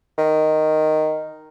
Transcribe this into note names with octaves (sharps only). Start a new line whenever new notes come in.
D#3